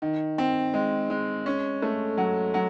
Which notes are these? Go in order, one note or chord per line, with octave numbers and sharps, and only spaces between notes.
D#3
C4
G#3
G#3
C#4
A3
F#3
F#3